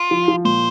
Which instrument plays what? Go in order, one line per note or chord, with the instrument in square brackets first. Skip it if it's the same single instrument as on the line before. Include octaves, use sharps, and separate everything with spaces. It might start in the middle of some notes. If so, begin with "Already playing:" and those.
Already playing: [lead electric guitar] F4
[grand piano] F3
F3
[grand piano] A#2 [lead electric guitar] C5